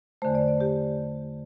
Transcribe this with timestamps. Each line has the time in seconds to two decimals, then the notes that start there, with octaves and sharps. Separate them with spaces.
0.22 E2 D3 A3 C5
0.35 D5
0.48 D5
0.60 G4